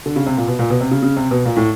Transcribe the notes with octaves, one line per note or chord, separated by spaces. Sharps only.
D3
C#3
C3
A#2
B2
A#2
B2
C3
C#3
C#3
C3
B2
A#2
A2